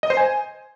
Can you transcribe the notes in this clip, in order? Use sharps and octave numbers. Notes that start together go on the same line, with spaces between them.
D#5
C5
G#5